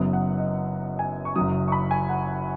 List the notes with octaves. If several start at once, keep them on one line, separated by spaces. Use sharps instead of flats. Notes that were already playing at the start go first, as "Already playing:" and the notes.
Already playing: F#1 F#2 F#3 B3 D#6
F#5
D#5
G#5
C#6
F#1 F#2 F#3 D#6
C#6
B5
G#5
F#5